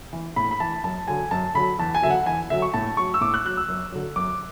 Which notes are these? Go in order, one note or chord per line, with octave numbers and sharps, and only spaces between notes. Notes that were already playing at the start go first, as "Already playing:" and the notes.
E3
A2 B5
B5
E3 A5
F#2 A5
D3 F#3 G#5
F#2 A5
D3 F#3 B5
E2 A5
G#5
D3 F#3 E5
F#5
E2 G#5
D3 F#3 E5
C#6
A2 A5
F#3 C#6
E6
A2 D6
F#6
F#3 F#6
E6
F#2
D3 F#3
F#2 D6